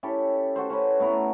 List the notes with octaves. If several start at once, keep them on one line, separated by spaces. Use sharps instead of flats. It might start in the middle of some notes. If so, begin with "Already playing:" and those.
C#4 E4 G4 A4
F#4 A4 C5
C#4 F#4 B4
A3 B3 E4 A#5